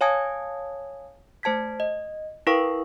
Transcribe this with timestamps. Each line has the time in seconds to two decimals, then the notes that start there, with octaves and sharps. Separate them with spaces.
0.01 C#5 F5 G#5 A5 D#6 G#6
1.43 A3 C5 A5 G#6 B6
1.80 D#5
2.47 E4 A#4 B4 F5 G5 C#6